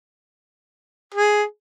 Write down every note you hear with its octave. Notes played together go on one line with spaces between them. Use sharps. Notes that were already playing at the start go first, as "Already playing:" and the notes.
G#4